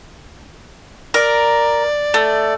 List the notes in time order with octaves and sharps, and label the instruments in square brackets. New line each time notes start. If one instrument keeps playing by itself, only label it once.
[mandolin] A#4 [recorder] D5
[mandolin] A3